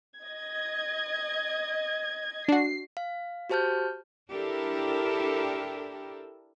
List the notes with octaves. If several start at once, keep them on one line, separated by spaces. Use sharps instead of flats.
D#5 G#6
D4 F#4 C7
F5
F#4 G4 C5 A5 F6 G6
D4 E4 G4 A4 A#4